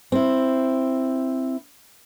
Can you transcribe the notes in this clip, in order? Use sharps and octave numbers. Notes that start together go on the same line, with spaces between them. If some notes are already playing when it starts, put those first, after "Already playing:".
C4 E4